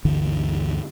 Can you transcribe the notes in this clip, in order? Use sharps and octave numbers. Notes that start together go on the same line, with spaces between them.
G1 D2 D3 E3